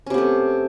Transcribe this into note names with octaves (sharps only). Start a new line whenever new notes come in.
C3 A3 B3 C#4